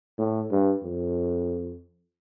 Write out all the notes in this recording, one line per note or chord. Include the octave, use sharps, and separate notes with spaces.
A2
G2
F2